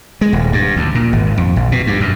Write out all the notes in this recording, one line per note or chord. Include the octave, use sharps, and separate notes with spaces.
G#3
D#1
G2
D2
A#2
G#1
F2
A#1
B2
G2
F#2